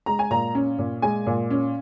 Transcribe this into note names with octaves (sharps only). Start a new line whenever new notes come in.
G#3 A#5
G#5
A#2 A#5
C#4
A#2
G#3 G#5
A#2
C#4